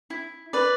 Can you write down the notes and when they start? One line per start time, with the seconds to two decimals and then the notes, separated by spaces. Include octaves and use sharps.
0.10 E4
0.53 B4 D5